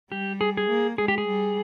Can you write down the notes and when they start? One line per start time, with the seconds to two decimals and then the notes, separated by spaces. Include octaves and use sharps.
0.11 G3 G4
0.41 G#4
0.57 G#4
0.69 A#3
0.98 G#3 G#4
1.08 G4
1.18 G#4
1.27 G3